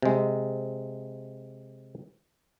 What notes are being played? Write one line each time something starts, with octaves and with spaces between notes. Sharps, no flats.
C3 G#3